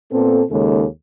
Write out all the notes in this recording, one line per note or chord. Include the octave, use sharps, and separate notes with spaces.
A#2 B3 C4 A4
D#2 C#3 G#3 D#4 G#4 A4